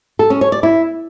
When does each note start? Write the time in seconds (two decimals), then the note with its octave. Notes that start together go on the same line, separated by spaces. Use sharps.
0.19 A4
0.30 C#4
0.41 C#5
0.52 D5
0.63 E4